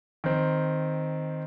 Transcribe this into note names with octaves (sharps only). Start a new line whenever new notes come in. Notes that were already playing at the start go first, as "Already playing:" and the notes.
D#3 C4